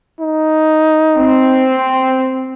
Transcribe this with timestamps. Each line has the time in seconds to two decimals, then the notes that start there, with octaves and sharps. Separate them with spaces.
0.20 D#4
1.17 C4